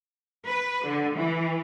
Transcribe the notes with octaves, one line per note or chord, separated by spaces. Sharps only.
B4
D3
E3